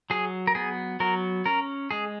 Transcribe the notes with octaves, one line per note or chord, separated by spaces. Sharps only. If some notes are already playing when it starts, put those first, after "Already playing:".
F#3 G#4
A#4
B3 G#4
F#3 A#4
C#4 A#4
G#3 G#4